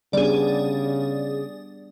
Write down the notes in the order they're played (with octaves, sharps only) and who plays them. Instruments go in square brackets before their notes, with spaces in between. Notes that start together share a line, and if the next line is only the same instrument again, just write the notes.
[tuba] C#3 [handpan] G3 B3 D4 [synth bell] G#4 D5